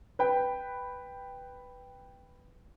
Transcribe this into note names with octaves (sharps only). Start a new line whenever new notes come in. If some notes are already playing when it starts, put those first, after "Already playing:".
B4 G5